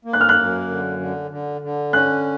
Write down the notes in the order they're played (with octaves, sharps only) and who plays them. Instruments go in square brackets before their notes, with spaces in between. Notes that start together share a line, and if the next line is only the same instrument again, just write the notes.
[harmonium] A#3
[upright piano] F#6
F6
F#6
[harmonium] F#2
D3
D3
D3
D3
[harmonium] C#4 [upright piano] F#6